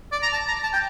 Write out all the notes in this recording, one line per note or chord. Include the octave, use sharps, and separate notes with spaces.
D5
A#5
A5
A#5
A5
G5